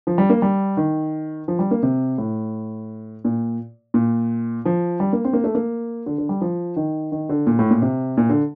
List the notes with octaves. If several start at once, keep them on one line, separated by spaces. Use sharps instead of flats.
F3
G3
A#3
G3
D#3
F3
G3
A#3
C3
A2
A#2
A#2
F3
G3
A#3
C4
A#3
A3
A#3
D3
D3
G3
F3
D#3
D#3
D3
A#2
A2
A#2
C3
A#2
D3